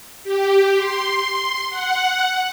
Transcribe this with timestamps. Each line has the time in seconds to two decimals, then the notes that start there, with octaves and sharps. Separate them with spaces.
0.24 G4
0.77 C6
1.70 F#5